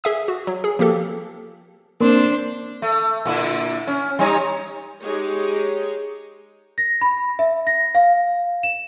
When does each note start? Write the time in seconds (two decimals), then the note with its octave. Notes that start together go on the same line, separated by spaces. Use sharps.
0.04 G#4 E5 D#6
0.28 F#4
0.47 F#3
0.64 G#4
0.79 F3 A#3 G4 A4
2.01 A#3 C4 D4 A#4 C5 A5 C6
2.82 A3
3.25 A#2 D3 E4
3.87 C#4
4.19 G3 D#4 C#5
5.03 G#3 D#4 G4 G#4 C#5
6.78 A#6
7.01 B5
7.39 E5
7.67 A#6
7.95 F5
8.63 E7